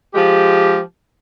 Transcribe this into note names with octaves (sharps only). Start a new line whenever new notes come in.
F3 G#3 G4